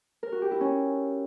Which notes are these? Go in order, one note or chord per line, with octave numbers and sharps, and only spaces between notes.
A#4
F#4
G4
E4
C#4